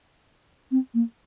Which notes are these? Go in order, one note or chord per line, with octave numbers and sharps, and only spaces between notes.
C4
A#3